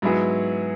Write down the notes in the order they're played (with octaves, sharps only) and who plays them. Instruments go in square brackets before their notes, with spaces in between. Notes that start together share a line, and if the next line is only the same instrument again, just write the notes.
[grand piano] G#2 F#3 B3 E4 G#4